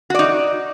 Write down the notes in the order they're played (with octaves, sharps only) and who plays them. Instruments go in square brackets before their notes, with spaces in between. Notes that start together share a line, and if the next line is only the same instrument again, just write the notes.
[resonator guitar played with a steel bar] F#4
D5
D#4